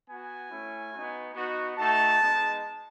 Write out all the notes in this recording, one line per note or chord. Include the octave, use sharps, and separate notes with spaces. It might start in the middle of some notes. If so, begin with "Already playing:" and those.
B3 F#4 G#5
A3 C#4 E4
B3 D#4 F#4
B3 D#4 F#4
A3 D#4 F#4 A5
G#3 B3 D#4